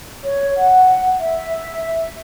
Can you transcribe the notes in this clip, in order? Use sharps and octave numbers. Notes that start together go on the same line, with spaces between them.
C#5
F#5
E5